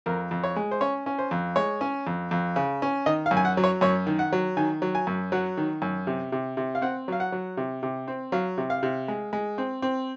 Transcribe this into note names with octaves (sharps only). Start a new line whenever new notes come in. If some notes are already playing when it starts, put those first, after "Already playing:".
F2 A#4
F2
C#5
G#3
C5
C#4 C#5
C#4
C5
F2
G#3 C#5
C#4
F2
F2
C#3
C#4
D#3 D#5
F5
F#2
G#5
F#5
F#3
C#5
F#2 C#5
D#3
F#5
F#3
D#3 G#5
F#3
G#5
F#2
F#3 F#5
D#3
F#2
C3
C3
C3
F5
C4 F#5
F#3 F5
F#5
F#3
C3
C3
C4
F#3 F5
C3
F5
C3
G#3
G#3
C4
C4